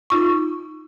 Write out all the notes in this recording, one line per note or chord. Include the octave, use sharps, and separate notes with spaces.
D#4 F4 C#6